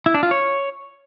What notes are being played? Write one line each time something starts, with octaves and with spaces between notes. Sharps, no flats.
E4
D4
F4
C#5